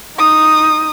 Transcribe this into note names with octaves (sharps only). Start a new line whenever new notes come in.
D#4 D#6